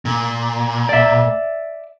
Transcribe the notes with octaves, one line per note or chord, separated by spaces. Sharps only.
A#2
D5 E5